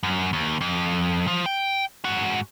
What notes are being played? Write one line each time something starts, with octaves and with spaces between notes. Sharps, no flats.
F#2
D#2
F2
F3
G5
G#2 F#4